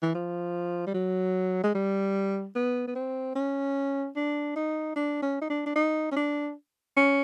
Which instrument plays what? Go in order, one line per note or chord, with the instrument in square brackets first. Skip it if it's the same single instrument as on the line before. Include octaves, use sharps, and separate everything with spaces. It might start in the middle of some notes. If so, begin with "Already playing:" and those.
[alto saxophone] E3
F3
G3
F#3
G#3
G3
B3
B3
C4
C#4
D4
D#4
D4
C#4
D#4
D4
D4
D#4
C#4
D4
C#4